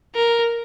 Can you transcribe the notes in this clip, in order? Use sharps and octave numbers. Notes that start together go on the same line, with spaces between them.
A#4